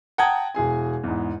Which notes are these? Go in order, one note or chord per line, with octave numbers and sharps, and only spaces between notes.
F#5 G5 A5 A#5 D#6 G#6
E1 G#4 G#5
E2 G#2